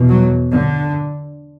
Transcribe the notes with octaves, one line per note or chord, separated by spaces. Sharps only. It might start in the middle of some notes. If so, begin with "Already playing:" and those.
Already playing: E2 B2
F#3
D3